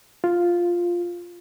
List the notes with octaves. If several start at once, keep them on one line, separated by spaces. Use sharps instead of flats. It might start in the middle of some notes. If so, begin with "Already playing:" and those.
F4